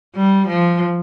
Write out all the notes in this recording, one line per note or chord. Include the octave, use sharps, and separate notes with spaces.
G3
F3